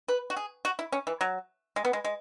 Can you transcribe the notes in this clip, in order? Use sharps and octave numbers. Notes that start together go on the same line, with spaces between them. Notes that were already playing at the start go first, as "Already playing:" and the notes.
B4
F#4
G#4
F#4
E4
C#4
E3
F#3
G#3
B3
G#3
G#3